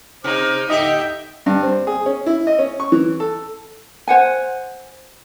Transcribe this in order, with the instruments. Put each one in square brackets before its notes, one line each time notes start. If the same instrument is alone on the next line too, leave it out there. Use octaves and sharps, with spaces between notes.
[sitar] C3 [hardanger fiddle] D#4 [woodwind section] C5 D6 F6
[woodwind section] D#2 A2 D3 [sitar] D#4 G4 [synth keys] D#5 [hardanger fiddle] E5 G5
[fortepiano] G2
C4
G#4
C#4
E4
D#5
C#4
C#6
E3
A4
[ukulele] C5 F#5 G#5